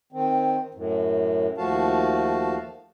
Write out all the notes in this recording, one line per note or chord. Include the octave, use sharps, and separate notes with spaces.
D#3 C4
F#2 A2
D#2 F3 A3 F#4 F5 A5